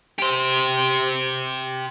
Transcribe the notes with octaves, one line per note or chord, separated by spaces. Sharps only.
G4 C5